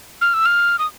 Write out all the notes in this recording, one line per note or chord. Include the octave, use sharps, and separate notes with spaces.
F6
E6
F6
D#6